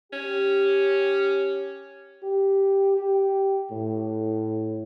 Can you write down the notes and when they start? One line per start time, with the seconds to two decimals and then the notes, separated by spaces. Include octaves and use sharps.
0.13 C#4 G4
2.23 G4
2.97 G4
3.72 A2